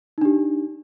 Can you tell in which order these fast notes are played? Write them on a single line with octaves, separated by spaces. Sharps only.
D#4 D4 G4